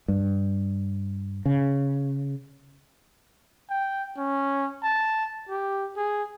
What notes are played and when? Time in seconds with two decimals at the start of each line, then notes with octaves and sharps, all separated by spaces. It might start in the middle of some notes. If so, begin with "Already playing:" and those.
0.08 G2
1.46 C#3
3.70 G5
4.17 C#4
4.83 A5
5.49 G4
5.97 G#4